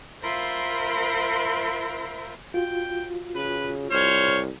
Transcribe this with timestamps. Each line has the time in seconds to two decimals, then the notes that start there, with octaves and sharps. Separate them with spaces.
0.23 F4 A#4 C5 E5 B5 C6
2.54 F4 F#4 G5
3.35 C#3 B4
3.91 C2 C5 C#5 F6